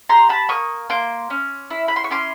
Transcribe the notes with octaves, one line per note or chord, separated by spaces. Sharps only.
G4 A#5 C6
A5 B5
A#3 C#6 D#6
A#3 C6 D6
C#4
E4
B5
C6
C#6
C#4 C6 D6